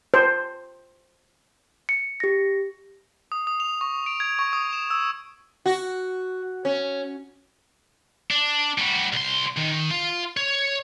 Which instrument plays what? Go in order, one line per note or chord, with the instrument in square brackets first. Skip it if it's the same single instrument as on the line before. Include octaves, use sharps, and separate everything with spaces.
[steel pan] C5
[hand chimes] C#7
G4 A#6
[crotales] D#6
D#6
F7
C#6
D7
G#6
C#6
D#6
E7
E6
[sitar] F#4
C#4
[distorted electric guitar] D4
G3 F#4
C2 C6
D#3
F4
C#5